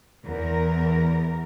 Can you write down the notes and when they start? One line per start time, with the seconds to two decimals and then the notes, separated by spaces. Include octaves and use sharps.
0.24 E2 A#4